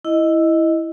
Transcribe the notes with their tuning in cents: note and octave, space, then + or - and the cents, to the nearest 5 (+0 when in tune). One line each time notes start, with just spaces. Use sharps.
E4 +0 D#5 +5